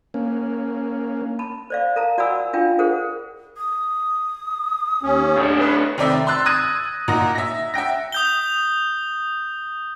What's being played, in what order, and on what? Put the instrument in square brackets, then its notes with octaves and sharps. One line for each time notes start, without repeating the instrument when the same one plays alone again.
[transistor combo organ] A#3 C#4
[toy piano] A5 B5
C5 D5 F5
A#4 F5 A5 A#5
F#4 D5 F#5 G#5 B5 E6
D4 F4 F5 G5
G#4 A#4 C5 F#5
[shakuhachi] D#6
[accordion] D#2 C#4
[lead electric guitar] A2 D4
[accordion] B4
[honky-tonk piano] F1 D#3 C4 D5 E5
C6 E6 F#6 A6
D#6 F#6 G#6 A#6 D#7
A#2 D#4 A#4 F#5 A#6
E5 A#6
E5 F#5 G5 A#6
[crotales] D#6 G6 G7